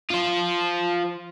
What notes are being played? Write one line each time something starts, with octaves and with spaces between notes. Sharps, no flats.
F4 C5